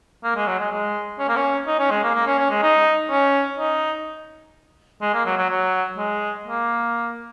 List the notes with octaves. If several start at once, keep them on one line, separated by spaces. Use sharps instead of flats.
A#3
G#3
F#3
G#3
G#3
C#4
A#3
C#4
D#4
C#4
G#3
A#3
A#3
C#4
C#4
G#3
D#4
C#4
D#4
G#3
A#3
F#3
F#3
F#3
G#3
A#3